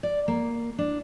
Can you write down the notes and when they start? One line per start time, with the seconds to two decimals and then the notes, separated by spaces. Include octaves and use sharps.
0.03 D5
0.28 A#3
0.78 D4